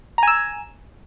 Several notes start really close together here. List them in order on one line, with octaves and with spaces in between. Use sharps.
A#5 G#5 E6